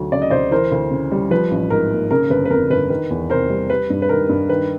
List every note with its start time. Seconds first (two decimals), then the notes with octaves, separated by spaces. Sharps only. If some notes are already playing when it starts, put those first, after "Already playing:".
Already playing: D2 F#3
0.12 C#3 D5
0.22 D#5
0.30 D2 C5 D5
0.51 E3 A#4 C5
0.72 D2
0.91 C#3
1.12 G3
1.31 F3 B4
1.51 A1
1.70 G#2 A#4
1.91 A#3
2.11 C#3 A#4
2.30 G1 B4
2.45 B4
2.50 F2 A#4
2.70 G1 B4
2.90 D#3 B4
3.10 E2
3.30 C3 A#4 C5
3.50 G3
3.70 G3 B4
3.90 G2
4.02 B4
4.09 D#3 A#4
4.29 G2
4.49 D#3 B4